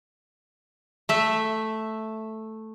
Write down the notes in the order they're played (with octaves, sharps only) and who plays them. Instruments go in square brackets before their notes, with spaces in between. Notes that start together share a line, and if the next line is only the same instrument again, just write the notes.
[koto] A3 E5